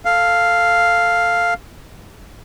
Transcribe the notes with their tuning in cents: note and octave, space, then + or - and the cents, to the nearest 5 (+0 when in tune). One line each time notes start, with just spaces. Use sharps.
A4 +5 F5 +0